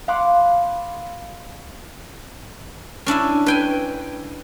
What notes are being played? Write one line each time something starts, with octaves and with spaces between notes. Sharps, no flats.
F5 F#5 B5 C6 D6 F#6
C#4 D4 E4 E5
B4 G5 G#5